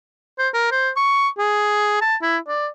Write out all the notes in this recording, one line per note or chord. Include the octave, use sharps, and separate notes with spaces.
C5
A#4
C5
C#6
G#4
A5
E4
D5